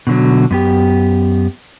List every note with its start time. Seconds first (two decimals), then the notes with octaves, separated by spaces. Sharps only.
0.07 B2 D3 F#3
0.51 F#2 B3 G4